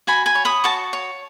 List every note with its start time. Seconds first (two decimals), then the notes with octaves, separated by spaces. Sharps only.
0.07 F#4 G#5 B5
0.26 G#5 B5
0.35 C#5
0.45 B5 D#6
0.64 F#4 A5 C#6
0.93 C#5